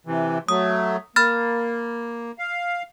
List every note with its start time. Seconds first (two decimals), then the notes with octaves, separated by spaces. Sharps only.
0.07 C3 E3
0.49 F#3 A3 D#6
1.16 A#3 B5 F6 A6
2.39 F5